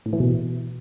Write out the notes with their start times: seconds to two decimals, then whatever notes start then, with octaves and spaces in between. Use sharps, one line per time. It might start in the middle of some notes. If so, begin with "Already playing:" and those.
0.06 A2
0.13 E3
0.20 B2